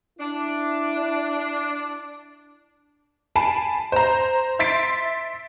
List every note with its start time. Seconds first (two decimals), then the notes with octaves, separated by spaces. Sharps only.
0.19 D4 E4
3.36 G#5 A5 B5 C7 D7
3.92 C5 A#5
4.59 E5 C6 A6 B6 C7 D7